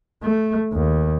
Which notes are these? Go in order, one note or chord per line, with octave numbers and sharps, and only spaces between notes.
A3
D#2